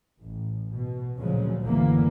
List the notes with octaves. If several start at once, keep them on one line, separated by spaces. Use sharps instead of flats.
A1
B2
D2 A#2 C#3 F3 F#3 G#3
F#1 D2 D3 E3 G3 A#3